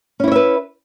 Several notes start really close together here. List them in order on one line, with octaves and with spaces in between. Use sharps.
C#4 E4 C#5 E5 B4